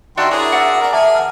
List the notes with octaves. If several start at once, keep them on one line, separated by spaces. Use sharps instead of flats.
D#3 D4 F#4 E5 G5 C6
D4 E4 G#4 A#4 C#5
F#4 D5 E5
A#3 A#4 D5
A#3 G#4 A#4 E5 G#5 A5 D6
F#5 F6